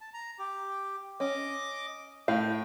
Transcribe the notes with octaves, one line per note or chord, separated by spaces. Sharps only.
A5
A#5
G4
C#4 D#5 D6
A2 F5 G5